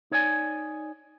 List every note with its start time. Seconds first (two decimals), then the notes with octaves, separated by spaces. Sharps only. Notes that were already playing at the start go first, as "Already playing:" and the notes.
0.11 D#4 C#5 D5 E5 G#5